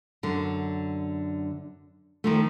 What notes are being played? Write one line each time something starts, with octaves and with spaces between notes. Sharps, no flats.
F#2 D3
D#3 F3 A3